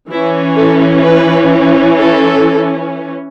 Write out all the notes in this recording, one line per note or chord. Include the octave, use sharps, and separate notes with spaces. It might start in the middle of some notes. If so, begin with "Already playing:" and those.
E3 C#4 E4
A4
B4
A4